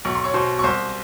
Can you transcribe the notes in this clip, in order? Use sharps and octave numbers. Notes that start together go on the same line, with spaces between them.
B1 C#6
C6
C#5 C#6
B2 C5 C6
C#6
C2 C5 C6